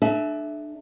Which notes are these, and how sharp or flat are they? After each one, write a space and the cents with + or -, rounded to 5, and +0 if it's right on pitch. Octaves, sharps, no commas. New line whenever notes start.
D4 +30 A4 -45 E5 -5